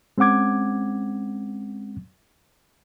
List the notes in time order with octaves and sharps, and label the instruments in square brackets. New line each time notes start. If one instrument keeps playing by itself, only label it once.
[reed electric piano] G#3 C4 C#4 F#5 D6 G#6